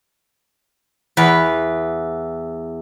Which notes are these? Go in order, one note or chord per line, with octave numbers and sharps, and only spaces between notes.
E2 B4